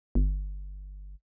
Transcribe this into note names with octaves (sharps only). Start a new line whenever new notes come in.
G1